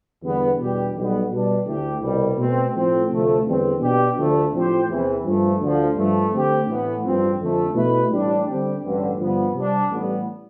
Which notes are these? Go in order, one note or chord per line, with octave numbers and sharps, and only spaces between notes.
E2 D3 G3 B3
E2 B2 G3 D4 G4
B1 B2 G3 B3
B2 G3 D4
D2 D3 A3 E4 G4
C2 B2 G3
B2 A3 C4
A2 F3 A3 C4
D2 C3 F3 A3
E2 D3 G3 C4
B2 B3 D4 G4
D2 D3 F3 A3 D4
A2 F3 C4 G4 C5
E2 C3 E3
G2 F3 A3
D2 D3 F3
G2 F3 A3
D3 A3 C4 G4
A2 E3 B3
A1 G2 F3 C4
F2 D3 F3 A3
B2 A3 E4 B4
A1 A2 G3 D4
D3 G3 C4 G4
A1 G2 D3
G2 D3 F3 B3
C3 G3 D4
A1 A2 G3 B3